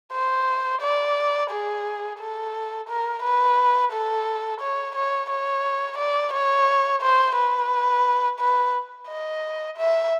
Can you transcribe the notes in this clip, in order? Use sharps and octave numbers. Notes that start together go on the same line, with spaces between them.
C5
D5
G#4
A4
A#4
B4
A4
C#5
C#5
C#5
D5
C#5
C5
B4
B4
D#5
E5